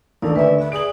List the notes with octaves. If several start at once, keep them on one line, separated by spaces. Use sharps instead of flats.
A1 D#2 D#3 D4 A4 D5
D2 B4 D5 E5
B4 E5
G#4 D5 D7 F#7